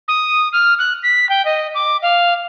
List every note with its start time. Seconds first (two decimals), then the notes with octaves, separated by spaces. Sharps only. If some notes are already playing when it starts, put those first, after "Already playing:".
0.08 D#6
0.53 F6
0.79 F#6
1.03 B6
1.29 G5
1.45 D#5
1.75 D6
2.02 F5